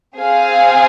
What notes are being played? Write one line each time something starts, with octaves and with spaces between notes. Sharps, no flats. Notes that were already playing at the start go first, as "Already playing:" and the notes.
C4 G#4 F5 G#5